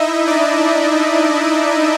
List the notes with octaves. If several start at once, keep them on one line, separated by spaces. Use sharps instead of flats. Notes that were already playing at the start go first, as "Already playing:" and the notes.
Already playing: D#4 E4 D#5 E5
D4 D5